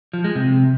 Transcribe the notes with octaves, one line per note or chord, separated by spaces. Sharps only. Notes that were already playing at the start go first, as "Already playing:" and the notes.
F3
G#3
C3